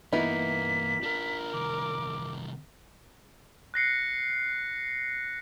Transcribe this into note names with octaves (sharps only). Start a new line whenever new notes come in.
G2 E3 A#3 B3 D#4 E4 B6
D4 F4 A#4
C2 D#3 D6
F#6 A#6 C7 C#7